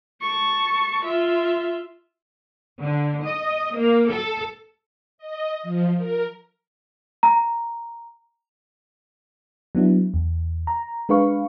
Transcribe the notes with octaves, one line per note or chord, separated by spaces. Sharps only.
A5 C#6
F4 E5
D3
D#5
A#3
A4
D#5
F3
A#4
A#5
F#3 B3 D4 E4
E2
A#5
G#3 D4 B4 F5 C#6